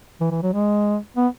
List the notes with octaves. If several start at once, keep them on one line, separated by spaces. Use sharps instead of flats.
E3
E3
F#3
G#3
B3